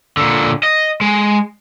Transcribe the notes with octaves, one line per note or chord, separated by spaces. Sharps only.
A#2 D3
D#5
G#3